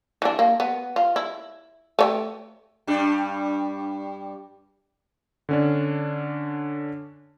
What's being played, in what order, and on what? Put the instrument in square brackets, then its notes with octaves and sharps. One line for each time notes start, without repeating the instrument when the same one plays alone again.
[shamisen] E3 D4
A#3
B3
F4
E4
A3 C#5 G5
[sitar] G2 G3 D4
[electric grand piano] D3 C#4 D4